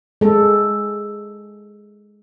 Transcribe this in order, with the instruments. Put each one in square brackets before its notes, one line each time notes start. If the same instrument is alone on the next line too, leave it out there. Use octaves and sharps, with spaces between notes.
[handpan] G#3 A4